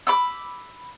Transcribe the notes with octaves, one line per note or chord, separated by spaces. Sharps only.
B5 D6 E6